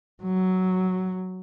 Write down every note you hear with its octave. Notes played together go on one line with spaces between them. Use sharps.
F#3